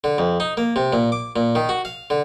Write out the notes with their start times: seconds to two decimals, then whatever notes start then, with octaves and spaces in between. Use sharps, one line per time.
0.04 D3
0.18 F2
0.40 D#4
0.57 A#3
0.76 C3
0.93 A#2
1.12 D6
1.36 A#2
1.55 D#3
1.69 F#4
1.85 F5
2.10 D3